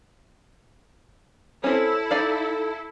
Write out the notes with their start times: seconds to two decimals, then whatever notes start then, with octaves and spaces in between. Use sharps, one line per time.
1.64 C4 C#4 E4 A4
2.11 D#4 D5 F5